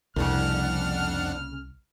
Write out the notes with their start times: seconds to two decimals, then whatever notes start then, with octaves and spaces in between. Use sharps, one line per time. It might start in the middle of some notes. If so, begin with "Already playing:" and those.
0.16 C2 F2 C#3 A#3 D4 F#5 F6